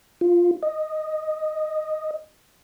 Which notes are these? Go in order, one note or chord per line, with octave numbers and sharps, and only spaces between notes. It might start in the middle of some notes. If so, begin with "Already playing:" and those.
F4
D#5